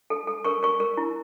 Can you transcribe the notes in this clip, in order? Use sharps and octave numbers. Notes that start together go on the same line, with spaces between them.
A4
A4
A#4 C#6
A#4 C#6
A#4
E4